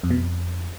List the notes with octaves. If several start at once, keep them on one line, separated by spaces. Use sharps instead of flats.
F2
B2
F2